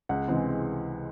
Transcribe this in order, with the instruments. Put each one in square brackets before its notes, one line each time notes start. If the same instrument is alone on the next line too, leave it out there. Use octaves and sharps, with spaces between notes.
[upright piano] C#2 F#5
C3 E3 G#3 C4